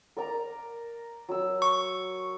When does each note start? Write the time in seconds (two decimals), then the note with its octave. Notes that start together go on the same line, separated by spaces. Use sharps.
0.17 A#4 D5 A#5
1.29 F#3 E6
1.62 C#6